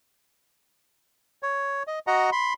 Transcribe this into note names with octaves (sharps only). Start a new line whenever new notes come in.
C#5
D#5
F#4 D#5 F#5 A#5
B5 C6